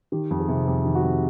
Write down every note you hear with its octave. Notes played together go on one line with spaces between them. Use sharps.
D#3 G4
F2
G#4
C3
F2 G4
D#3
F#4
F2